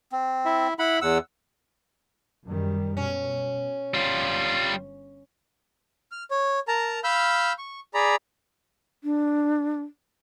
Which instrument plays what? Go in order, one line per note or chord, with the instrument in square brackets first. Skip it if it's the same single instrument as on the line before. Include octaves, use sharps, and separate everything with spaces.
[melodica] C4
[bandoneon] E4 E5
[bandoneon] E4 B5 [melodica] F#5
[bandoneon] E2 [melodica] F#5 E6
[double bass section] F#2 D#3 G3
[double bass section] B2 [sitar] C#4
[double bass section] G1 [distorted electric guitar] G3 F4
[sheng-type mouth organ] F6
C#5
A#4 A5 A#5
F5 B5 E6 F6 G6
C#6
G#4 D5 A#5 B5
[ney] D4